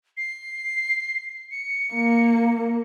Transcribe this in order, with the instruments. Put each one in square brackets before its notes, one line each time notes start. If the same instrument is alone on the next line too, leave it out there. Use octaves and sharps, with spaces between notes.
[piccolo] C7
C#7
[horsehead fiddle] A#3